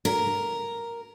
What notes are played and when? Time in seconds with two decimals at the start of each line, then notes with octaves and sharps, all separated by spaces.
0.05 A#4